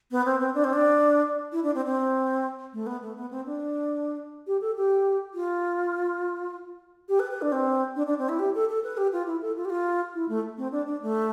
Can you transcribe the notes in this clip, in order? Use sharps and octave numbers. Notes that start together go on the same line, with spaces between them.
B3
C4
C4
D4
C4
D4
E4
D4
C4
C4
A3
B3
A3
B3
C4
D4
G4
A4
G4
F4
G4
B4
B4
D4
C4
D4
D4
C4
E4
G4
A4
A4
B4
G4
F4
E4
A4
F4
G4
F4
E4
A3
C4
D4
D4
A3